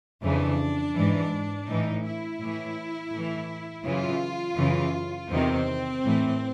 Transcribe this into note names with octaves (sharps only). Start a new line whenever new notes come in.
F2 C#3 E3 D4
G#2 E3
A2 E3 D#4
E4
A2 E3
A2 E3
F#2 C#3 E3 F4
F#2 C#3 E3
E2 C3 D#3 C4
A2 E3